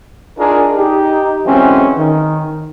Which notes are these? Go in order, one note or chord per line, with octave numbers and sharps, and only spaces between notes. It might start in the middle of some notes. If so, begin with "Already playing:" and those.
D4 D#4 F4 G#4 A#4
D#4 G4
D3 E3 F#3 G#3 C4 C#4
D#3